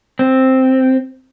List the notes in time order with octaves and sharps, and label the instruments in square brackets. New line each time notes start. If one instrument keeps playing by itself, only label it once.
[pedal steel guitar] C4